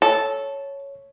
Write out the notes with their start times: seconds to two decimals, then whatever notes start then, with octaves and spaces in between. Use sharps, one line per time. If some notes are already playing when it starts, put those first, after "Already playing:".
0.02 A4 C#5